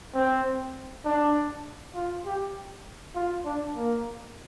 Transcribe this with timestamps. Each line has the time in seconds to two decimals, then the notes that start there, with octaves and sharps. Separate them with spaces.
0.15 C4
1.04 D4
1.94 F4
2.26 G4
3.15 F4
3.45 D4
3.75 A#3